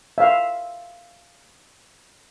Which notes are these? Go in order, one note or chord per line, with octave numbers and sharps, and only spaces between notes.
E5 F5